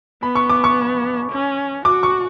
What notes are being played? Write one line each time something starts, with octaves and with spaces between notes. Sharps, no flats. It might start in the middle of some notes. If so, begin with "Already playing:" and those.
B3 B5
C#6
D6
C#6
C#4
F#4 D6
C#6